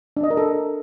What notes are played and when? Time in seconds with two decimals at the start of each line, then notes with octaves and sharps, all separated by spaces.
0.17 D4
0.23 D#5
0.30 A#4
0.37 A4